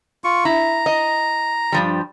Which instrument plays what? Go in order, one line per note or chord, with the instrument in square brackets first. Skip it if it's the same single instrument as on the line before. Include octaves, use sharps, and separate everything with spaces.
[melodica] F4 C#6
[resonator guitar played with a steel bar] E4 [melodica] A#5
[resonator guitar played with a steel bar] D#5
G2 F3 G3